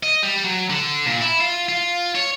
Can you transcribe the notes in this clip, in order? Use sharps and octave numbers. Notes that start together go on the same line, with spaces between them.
D#5
G3
F#3
D3
A#2
E4
F4
F4
C#5